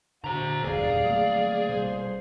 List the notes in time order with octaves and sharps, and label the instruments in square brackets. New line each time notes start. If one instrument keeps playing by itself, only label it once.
[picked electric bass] D3 [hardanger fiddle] F#4 [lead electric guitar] C5 A#5
[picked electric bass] E1 A#1 G2 [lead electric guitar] G#4 [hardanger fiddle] D5 F5
[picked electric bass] F#3 A3 A#3
[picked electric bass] B2 G3 [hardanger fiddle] C5